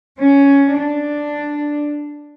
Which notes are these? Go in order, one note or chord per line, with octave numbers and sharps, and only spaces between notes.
C#4
D4